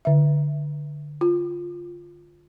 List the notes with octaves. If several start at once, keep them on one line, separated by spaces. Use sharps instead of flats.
D3 E5
F4